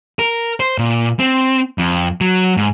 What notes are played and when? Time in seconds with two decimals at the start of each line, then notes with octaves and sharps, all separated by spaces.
0.19 A#4
0.60 C5
0.78 A#2
1.19 C4
1.78 F2
2.21 F#3
2.57 G#2